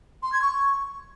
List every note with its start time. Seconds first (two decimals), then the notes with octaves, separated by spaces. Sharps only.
0.22 C6
0.32 G#6
0.42 C#6